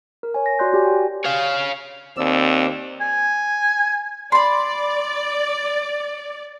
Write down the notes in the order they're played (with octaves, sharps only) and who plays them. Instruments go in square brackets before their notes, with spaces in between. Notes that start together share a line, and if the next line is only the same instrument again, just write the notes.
[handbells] A#4
C#5 G#5
A#6
F#4 C#5 D5 C6 F#6 G6
F#4 G4 D5 G#5
G5
[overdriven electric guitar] C#5 F5
[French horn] D#2 [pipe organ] C4 D5 E6
[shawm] G#5
[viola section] D5 [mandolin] B5 C6